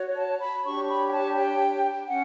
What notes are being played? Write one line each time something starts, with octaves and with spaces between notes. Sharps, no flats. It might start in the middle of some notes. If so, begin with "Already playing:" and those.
Already playing: F#4 C#5
A5
B5
D4 G4 C#5 C#6
B5
G5
A5
G5
C#4 F#5